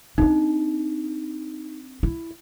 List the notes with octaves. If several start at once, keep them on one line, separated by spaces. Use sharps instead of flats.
C4 D4 D#4
E4